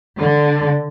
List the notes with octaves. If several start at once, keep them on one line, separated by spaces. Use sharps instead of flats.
D3